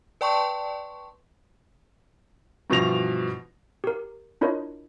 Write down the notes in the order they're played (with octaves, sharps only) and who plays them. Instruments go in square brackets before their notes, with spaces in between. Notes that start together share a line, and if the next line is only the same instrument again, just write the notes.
[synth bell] B4 D5 G5 A5 C6 C#6
[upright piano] G2 B2 E3 F3 A#6 F7
[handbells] G4 A#4
D4 E4 F4 A#4 C#5 D#5